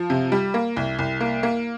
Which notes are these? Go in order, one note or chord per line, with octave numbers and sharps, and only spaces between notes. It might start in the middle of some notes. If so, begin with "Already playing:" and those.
Already playing: F3
C3
G3
A#3
C2
C2
A#3
A#3